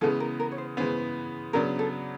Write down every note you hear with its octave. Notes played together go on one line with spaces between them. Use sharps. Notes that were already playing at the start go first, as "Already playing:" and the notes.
C#3 E3 G#3 B3 A4
A#4
A#4
C#5
C5
C#3 E3 G#3 B3 C5
C#3 F#3 B3 D4 A#4
A4